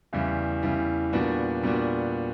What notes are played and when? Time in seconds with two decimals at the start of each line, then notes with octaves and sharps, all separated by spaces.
0.13 E2 C#3 E3 G3
0.63 E2 C#3 E3 G3
1.13 A#2 G3 B3 D4 F#4
1.63 A#2 G3 B3 D4 F#4